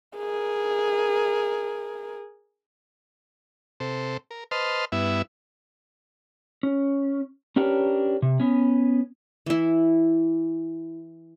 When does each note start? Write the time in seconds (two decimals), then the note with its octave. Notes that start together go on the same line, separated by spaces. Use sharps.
0.17 G#4 A#4
3.80 C3 A4 C5
4.31 A#4
4.51 B4 C5 D#5 A5 C6 F6
4.92 G2 B3 E4 E5
6.63 C#4
7.56 C#4 D4 G4 A#4 B4 C#5
8.22 C3
8.40 B3 C#4
9.46 E3 E4